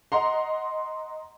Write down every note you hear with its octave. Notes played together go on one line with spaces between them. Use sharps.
D#5 F#5 A#5 C6